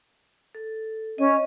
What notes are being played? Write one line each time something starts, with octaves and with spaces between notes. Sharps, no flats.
A4
C#4 D#5